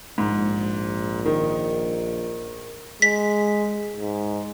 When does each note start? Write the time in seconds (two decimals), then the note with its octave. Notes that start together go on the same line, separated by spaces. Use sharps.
0.18 A#1 G#2
1.25 D#3
3.02 G#3 B6
3.96 G#2